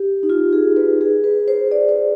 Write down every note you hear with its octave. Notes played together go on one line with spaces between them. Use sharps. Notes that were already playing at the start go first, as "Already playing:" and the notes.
Already playing: G4
D#4
F4
G#4
B4
G#4
B4
C5
D5
C5